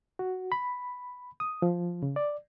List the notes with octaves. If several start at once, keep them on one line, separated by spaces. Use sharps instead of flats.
F#4
B5
D#6
F3
C#3
D5